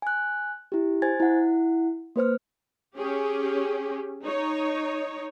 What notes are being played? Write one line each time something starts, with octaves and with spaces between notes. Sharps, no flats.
G#5 F#6
E4 G4
C5 G#5 G#6 A6
E4 F#5
A#3 B4 C5 F6
C#4 G4 G#4
D#4 C#5